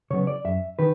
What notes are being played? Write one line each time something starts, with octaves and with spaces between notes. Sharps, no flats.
C#3 F#3 B3 C#5
D5
F#2 E5
D#3 B4